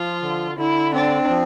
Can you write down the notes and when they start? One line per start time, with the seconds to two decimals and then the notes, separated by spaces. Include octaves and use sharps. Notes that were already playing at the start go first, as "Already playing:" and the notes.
Already playing: F3 F4
0.22 D3
0.58 D3 E4
0.94 C4 D4
1.29 F3